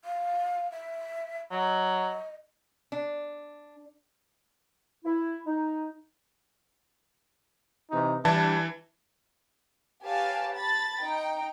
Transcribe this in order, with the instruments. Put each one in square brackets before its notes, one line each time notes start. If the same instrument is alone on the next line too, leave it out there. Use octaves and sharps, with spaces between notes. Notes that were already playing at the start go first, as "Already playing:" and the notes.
[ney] F5
E5
[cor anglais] F#3 [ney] D#5
[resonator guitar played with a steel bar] D4
[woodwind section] E4
D#4
[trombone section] C3 E3 D#4
[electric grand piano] E3 E4 A5 [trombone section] G3 D4
[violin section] G4 B4 C#5 F5 G#5 A5
A5 B5 A6
D#4 G5